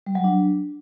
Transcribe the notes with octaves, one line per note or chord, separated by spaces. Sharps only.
G3
F#3
D4